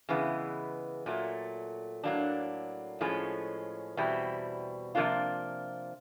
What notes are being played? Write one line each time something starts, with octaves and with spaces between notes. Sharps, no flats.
C#3 E3 G#3 B3
A#2 F#3 A3
A2 F#3 A#3 D4
A2 F3 G#3 C#4
E2 B2 G3 C4 E4
C3 F3 A#3 D4 F4